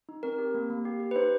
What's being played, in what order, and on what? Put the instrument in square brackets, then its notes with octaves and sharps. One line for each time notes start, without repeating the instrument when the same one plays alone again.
[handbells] D#4
C4 A#4
G4
A#3
A#3
G4
G4
B4
D#4 C5